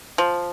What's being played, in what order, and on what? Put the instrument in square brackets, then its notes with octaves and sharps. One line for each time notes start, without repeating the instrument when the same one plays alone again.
[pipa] F3